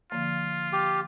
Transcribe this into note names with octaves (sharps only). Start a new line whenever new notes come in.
D3 F3 A#3 F4
G4